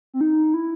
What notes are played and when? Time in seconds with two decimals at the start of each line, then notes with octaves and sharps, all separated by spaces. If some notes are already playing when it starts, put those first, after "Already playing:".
0.14 C4
0.21 D#4
0.54 E4